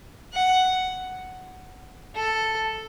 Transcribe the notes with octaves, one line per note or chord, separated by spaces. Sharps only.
F#5
A4